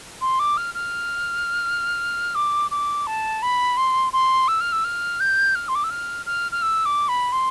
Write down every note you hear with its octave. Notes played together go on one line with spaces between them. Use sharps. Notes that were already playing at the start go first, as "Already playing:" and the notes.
C6
D6
F6
F6
D6
D6
A5
B5
C6
C6
E6
F6
E6
F6
G6
F6
C6
D6
E6
F6
F6
F6
E6
D6
B5
C6